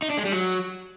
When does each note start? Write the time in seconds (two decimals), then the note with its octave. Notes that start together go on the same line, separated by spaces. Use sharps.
0.02 D#4
0.10 D4
0.17 G#3
0.25 G3
0.32 F#3